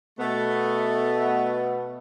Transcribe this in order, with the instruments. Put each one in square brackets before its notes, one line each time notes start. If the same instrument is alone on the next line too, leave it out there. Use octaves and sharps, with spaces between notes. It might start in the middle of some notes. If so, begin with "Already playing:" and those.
[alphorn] B2 [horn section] A3 B3